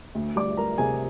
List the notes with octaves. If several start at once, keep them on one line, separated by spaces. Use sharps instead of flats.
D2
G3 D5 D6
G3 A#4 A#5
C3 G#4 G#5